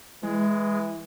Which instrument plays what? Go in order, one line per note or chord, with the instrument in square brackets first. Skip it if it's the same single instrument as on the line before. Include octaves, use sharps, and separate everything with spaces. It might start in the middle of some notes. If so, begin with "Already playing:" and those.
[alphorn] E3 [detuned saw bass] G#3